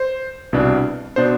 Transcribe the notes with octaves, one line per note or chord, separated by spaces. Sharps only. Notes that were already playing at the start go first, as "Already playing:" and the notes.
Already playing: C5
C2 B2 B3 D4
B2 B3 D4 C5